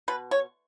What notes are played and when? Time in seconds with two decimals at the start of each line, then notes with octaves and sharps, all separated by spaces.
0.08 B2 B4
0.31 C#5